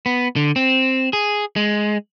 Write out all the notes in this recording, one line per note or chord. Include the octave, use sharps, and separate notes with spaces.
B3
D3
C4
G#4
G#3